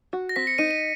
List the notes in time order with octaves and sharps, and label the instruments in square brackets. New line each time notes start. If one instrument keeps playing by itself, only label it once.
[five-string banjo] F#4
[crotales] A#6
[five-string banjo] C4 [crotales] B6
[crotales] C#7
[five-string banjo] D#4 [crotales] D#7
[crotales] D#7